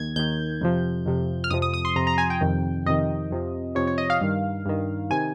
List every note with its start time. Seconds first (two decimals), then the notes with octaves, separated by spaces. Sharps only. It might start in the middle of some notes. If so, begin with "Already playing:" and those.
Already playing: D#2 D#3 G#6
0.16 D#2 D#3 G6
0.61 F2 C3 F3
1.06 F2 C3 F3
1.44 F6
1.51 F2 C3 F3 D#6
1.62 D#6
1.74 D#6
1.85 C6
1.96 F2 C3 F3 A#5
2.07 A#5
2.18 G#5
2.30 G5
2.41 F2 C3 D#3
2.86 F2 C3 D#3 D#5
3.31 F2 C3 F3
3.75 F2 C3 F3 C#5
3.87 C#5
3.98 D#5
4.10 F5
4.21 G2 D#3
4.66 G2 D#3
5.10 C3 D#3 G#5